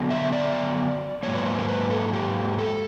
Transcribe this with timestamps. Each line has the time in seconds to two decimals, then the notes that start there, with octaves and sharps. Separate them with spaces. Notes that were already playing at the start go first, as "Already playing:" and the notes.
Already playing: D3 F#3 B3 D4
0.10 E5
0.32 D5
1.23 G#2 D#3 F#3 A#3 C#5
1.35 B4
1.45 C5
1.59 A#4
1.68 B4
1.90 A4
2.13 G4
2.58 A4